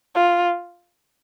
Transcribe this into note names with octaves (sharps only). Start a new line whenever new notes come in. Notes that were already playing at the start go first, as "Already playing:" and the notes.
F4